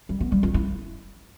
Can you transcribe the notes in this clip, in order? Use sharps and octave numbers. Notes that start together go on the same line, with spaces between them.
G3
B3
G3
F4
E4